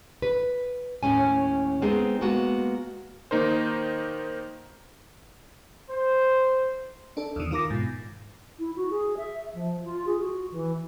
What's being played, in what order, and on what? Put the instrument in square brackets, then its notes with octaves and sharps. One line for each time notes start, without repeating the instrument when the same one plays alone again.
[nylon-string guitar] B4
D#2 A2 C#4 G#5
G#3 B3 C4 D#4 G#4
G#3 A#3 B3 F#4
[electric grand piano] D#3 A#3 D#4 A#4 C5
[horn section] C5
[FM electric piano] D4 A4
E2 D#3
D#3 F4 A#4 D6 A#6
G#2 B2
[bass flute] E4
F#4
G#4
E5
F3
F4
G#4
F#4
E3